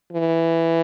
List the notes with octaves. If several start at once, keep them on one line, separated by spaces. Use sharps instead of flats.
E3